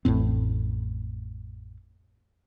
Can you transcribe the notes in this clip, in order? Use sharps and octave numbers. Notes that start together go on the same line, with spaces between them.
A1 F2 A2 C4